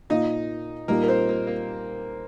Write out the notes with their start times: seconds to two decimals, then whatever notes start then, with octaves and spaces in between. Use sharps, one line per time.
0.10 A#2 A#3 D#4 F4 D#5
0.88 A#2 G3 A#3 D#4 G4 A#4
1.03 A#4
1.08 C4 C5
1.29 A#3
1.47 A#3